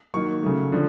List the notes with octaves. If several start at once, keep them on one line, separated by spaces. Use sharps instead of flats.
D#3 F#3 A#3 C#6
C#3 F#3 A3
D3 F3